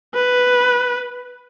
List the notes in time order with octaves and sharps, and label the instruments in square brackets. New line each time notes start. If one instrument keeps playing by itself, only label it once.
[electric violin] B4